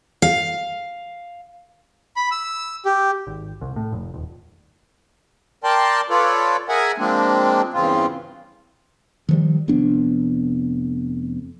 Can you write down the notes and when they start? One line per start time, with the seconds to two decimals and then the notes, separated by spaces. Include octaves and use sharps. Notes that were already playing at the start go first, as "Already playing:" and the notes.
0.22 F5
2.16 B5
2.31 E6
2.85 G4
3.27 G#1
3.61 C2
3.76 A2
3.92 F1
4.14 D#1
5.64 A#4 D5 G5 A5 C6
6.10 F4 A4 B4 C#5 D5
6.69 G#4 A#4 E5 F#5 G#5
6.98 F3 G#3 A#3 C4 D4
7.74 E2 G2 C#3 C4 F4
9.29 D#3 F3 G3
9.68 F1 F2 B3 D4